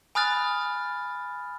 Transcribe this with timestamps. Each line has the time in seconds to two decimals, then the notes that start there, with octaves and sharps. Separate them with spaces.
0.15 G#5 B5 D#6 F6 F#6 A6